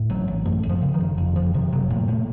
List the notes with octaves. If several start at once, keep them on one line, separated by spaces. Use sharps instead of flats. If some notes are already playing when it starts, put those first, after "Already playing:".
Already playing: A2
A1 F#3
A1
F#2 A3
F#1
F3
C#3
D#3
F#1
F2
F#1 F3
C3 D#3
F#1 F#3
A#2 A3
A#2 A3